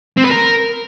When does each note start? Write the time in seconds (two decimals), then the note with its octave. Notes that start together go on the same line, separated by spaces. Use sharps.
0.17 C4
0.24 B4
0.31 A#4